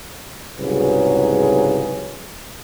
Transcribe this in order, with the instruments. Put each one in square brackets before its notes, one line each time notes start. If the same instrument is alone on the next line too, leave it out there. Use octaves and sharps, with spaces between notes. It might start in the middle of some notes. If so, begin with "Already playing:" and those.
[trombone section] C2 G#2 C#3 F#3 G#4 B4